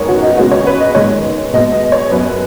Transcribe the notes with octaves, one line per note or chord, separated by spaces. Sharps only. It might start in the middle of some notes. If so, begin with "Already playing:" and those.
Already playing: F#2 D#3 G#3 B3 C#5
F#4
D#4
C#3 G#3 B3 F#4
C#5
B4
D#5
G#2 D#3 G#3 B3 C#5
B2 G#3 B3 D#5
D#5
C#5
F#2 F#3 B3 B4